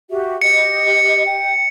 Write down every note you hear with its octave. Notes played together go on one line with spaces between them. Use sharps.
F#4 G4 E5
G4 D#5 C#7
G5